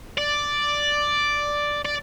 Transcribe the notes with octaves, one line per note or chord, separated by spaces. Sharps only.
D5
D5